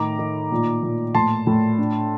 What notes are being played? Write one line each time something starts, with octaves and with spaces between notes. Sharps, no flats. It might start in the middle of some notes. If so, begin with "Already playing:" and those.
Already playing: A2 D#3 A#5 D6
D#3
A#2
A#2
A2 A5 C6
A2
D4